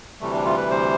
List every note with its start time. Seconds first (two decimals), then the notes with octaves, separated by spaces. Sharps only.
0.21 D2 C3 E3 G3 A3
0.34 D4
0.45 F4
0.58 B4
0.70 C5